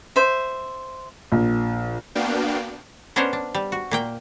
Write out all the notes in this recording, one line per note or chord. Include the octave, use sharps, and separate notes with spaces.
C5 E5
A#1
A#3 B3 D4 F#4 F5 G5
B3 C#4 D4 A#4 C5 C#5
D4
G3
F#4
A#2 A#3 G5